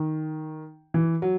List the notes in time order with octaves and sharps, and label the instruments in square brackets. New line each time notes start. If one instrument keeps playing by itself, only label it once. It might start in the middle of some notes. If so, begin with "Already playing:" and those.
Already playing: [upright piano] D#3
E3
F#3